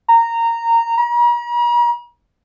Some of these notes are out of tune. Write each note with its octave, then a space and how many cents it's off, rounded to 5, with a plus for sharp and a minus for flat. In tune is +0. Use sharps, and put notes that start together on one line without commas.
A#5 -15
A#5 +45